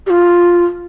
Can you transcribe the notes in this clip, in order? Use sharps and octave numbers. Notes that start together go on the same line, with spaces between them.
G4
F4